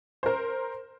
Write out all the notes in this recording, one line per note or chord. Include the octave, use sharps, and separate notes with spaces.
A#4 C5